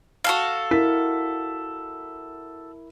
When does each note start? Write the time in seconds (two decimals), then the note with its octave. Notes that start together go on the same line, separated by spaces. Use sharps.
0.24 F#4 A4 F5
0.71 E4 A#4 B6